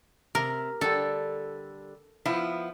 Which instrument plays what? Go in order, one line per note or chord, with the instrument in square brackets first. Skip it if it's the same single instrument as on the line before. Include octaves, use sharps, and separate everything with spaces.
[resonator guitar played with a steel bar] C3 [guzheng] A#4
[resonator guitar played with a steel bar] D3 G3 [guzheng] A4
[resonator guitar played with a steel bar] F3 B3 E4